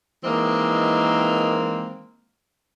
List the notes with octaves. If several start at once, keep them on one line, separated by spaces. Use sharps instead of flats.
D#3 E3 G#3 A#3 C4